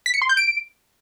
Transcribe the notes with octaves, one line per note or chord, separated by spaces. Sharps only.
B6
C#7
C6
G6
D7